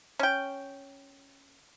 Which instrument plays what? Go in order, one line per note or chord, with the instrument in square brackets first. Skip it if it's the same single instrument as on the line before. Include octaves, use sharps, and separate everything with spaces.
[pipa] C#4 G5